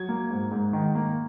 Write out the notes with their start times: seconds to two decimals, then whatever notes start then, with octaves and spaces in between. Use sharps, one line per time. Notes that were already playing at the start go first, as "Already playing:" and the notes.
Already playing: F#3 G#6
0.09 A#3
0.31 G#2
0.52 G#2
0.73 D#3
0.95 A#3